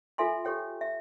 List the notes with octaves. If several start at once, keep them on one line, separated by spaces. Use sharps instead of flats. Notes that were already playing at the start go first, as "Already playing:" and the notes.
F4 A4 E5 G#5 C6
G4 A4 C#5 G5
E5